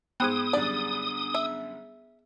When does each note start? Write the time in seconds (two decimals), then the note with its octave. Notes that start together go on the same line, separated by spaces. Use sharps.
0.20 G#2 B3 G#4 C5 G5 D#6
0.53 F#2 D3 G3 D5
1.34 E5